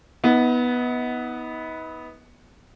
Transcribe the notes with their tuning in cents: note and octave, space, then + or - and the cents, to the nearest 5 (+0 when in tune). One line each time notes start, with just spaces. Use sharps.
B3 -5 D#4 +40